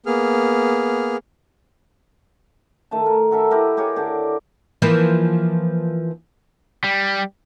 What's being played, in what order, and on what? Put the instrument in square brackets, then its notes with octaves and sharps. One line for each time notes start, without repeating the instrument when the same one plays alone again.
[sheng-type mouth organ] A#3 B3 G#4 F6
[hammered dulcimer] D#3 A3 A5
A#4
F#4 A4 A#4 E5
E4 G4 A#4 D#5
G4 G#4 A#4 C#5
D3 D4 G4
[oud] E3 F3 A#3
[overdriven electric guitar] G3